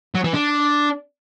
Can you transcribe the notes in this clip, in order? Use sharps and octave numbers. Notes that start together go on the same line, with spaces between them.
F#3
E3
D4